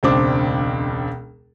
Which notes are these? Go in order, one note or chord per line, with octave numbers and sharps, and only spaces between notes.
E1 C#2 C4 D4 D6